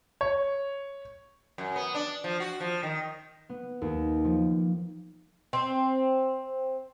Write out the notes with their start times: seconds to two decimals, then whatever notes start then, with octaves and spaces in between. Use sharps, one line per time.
0.21 C#5
1.58 F#2
1.76 B3
1.94 D4
2.24 F3
2.40 F#4
2.60 F3
2.83 D#3
3.49 B3
3.82 D#2
4.24 F3
5.53 C4